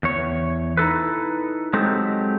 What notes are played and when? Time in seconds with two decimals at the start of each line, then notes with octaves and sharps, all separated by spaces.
0.03 E2 C#5
0.77 D#4 E4 A4 B4
1.73 F#3 G#3 C4 D#4 G4 A4